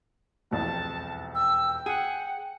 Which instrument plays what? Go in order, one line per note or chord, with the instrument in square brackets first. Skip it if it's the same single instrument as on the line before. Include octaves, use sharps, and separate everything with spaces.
[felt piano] E1 C2 F2 [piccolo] A5
[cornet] G5 [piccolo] E6
[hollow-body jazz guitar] G#4 [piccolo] F#5 [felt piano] D#7